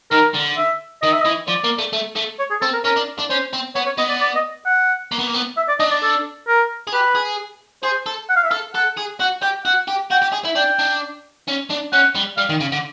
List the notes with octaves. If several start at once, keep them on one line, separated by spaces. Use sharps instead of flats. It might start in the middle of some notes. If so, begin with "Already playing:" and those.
D#3 A#4
D3
E5
D#3 D#5
E5
D#5
E3
F3 D5
A#3
A3
A3
A3
C#5
G#4
C4 A4
A#4
C#4 A#4
D4
D4
C#4 C5
C4
B3 C#5
C#5
B3 D#5
D5
D5
D#5
F#5
A#3
B3
A#3
B3
E5
D5
D4 D#5
D5
A4
A#4
G#4
G4 B4
G#4
G#4 C5
A4
F#5
F5
E5
A4 F5
A4 F#5
G#4
F#4 F#5
G4 G5
F#4 F#5
G4
F#4 G5
G4
G#4
E4
D4 G5
D4
C#4
D4
C#4 F#5
G3
G3 F5
D#3
C#3
D3